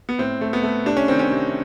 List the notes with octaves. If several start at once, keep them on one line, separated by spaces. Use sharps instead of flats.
B3
A2 C4
A3
B3
A3
C3 D4
C#4
D#3 C4
C#4
C3